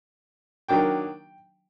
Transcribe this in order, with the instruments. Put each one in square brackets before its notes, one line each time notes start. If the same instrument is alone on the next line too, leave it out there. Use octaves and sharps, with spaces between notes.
[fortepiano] D#3 F#3 A#3 D4 G5